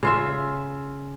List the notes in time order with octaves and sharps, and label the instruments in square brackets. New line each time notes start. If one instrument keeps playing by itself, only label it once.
[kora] C#3 F4 E5